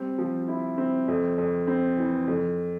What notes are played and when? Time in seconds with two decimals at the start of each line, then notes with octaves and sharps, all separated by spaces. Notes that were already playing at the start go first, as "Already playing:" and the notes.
Already playing: G3 C4
0.18 F3
0.48 E4
0.78 C4
1.08 F2
1.38 F2
1.67 C4
1.98 E3
2.28 F2